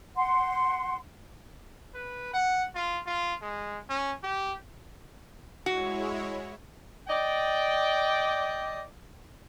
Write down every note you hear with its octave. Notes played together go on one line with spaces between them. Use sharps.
F#5 C6
B4
F#5
F4
F4
G#3
C#4
G4
G#3 E4 F#4 C#5
D5 D#5 G5